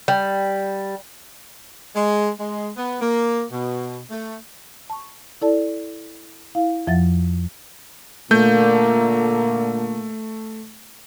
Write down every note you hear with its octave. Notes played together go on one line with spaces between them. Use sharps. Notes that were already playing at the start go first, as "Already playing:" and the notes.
G3
G#3
G#3
B3
A#3
B2
A3
A5 C#6
E4 A4 D5 A5
E4 F5
F2 F3 E5 F#5 A6
A#2 D3 A3 A#3 G6